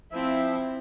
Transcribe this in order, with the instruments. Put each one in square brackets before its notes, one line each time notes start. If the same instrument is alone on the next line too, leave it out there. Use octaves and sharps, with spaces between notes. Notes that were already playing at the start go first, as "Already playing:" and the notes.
[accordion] F3 E5 [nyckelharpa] C4 E4